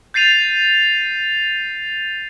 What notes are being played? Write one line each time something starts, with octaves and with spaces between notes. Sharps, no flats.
G6 A6 C7 D#7 F7